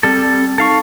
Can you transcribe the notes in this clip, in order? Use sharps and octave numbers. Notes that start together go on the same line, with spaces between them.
G3 C4 A4
D#4 A4 F5 C#6